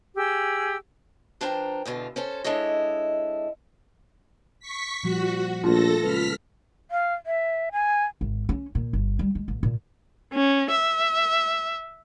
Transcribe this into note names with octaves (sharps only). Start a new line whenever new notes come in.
G4 G#4 E6
F3 D4 B4 C5 G5 A#5
E2 B2 D3 F4
C#4 A4 C5
G#3 D4 E4 A4 C#5 D#5
C#6 B6
A#2 F3 G3 F#4
A#1 A3 A#3 F4 A4 A5 A#6
C#2 B4 F6 B6
F5
E5
G#5
G#1
C#4
A#2
G1
G3
G#3
A1
A#2
C#4
E5